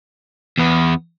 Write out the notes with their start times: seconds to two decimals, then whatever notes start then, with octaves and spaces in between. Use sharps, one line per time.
0.58 E2 B3